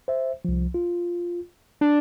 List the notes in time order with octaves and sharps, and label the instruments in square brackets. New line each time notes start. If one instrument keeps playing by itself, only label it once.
[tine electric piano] C5 E5
C2 F3
F4
[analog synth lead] D4 [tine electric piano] D5